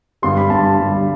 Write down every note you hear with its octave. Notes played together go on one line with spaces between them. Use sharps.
G2 D3 G3 C6
B5
G2 D3 G3 A5
G2 D3 G3